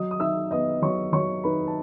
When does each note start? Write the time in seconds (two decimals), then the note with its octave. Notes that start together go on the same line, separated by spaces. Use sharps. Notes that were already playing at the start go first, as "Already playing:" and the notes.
Already playing: F#3 D#5 D#6
0.11 D#6
0.20 D#4 E5 E6
0.51 B3 D#5 D#6
0.82 F#3 C#5 C#6
1.13 F#3 C#5 C#6
1.44 D#4 B4 B5
1.67 A5